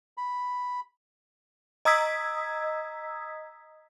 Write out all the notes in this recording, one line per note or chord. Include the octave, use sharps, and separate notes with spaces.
B5
D#5 A#5 D#6 E6 G#6 B6